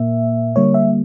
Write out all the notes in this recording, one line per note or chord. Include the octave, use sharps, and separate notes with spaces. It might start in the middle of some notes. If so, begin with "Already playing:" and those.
Already playing: A#2 A#3 E5
D3 G3 A#3 C#5
E5